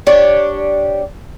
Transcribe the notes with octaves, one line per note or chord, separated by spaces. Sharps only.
D4 G4 C#5